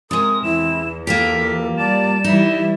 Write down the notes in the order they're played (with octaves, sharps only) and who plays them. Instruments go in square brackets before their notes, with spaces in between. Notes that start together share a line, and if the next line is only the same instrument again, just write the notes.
[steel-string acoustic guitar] C3 G#3 [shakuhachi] A#4 [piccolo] D#6
[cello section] E2 [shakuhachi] E4 [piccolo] E7
[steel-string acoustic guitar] A#3 F4 G4 [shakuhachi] A4 [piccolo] B6
[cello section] G3 D5 [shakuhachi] A5 [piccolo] E7
[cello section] E3 G3 E4 [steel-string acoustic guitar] D#4 [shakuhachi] E5